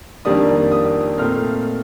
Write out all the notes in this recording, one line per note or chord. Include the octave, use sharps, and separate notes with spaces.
F2 D#3 G3 A#3 D4 D#6
D#6
A#2 A3 C4 F6